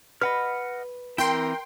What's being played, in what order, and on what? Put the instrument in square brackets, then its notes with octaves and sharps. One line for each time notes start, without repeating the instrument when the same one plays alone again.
[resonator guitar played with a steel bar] B4 [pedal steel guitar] D#5 F#5 F6
[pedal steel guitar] E3 C4 E4 [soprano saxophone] A#4 [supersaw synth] G5 C6